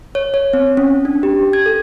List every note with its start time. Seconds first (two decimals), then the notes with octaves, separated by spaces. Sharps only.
0.15 C#5
0.34 C#5
0.53 C4
0.77 C#4
1.05 D4
1.23 G4
1.53 G#6
1.66 A4